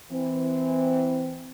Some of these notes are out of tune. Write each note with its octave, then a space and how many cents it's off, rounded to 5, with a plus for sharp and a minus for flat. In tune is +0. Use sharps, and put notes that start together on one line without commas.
E3 -5 C4 -20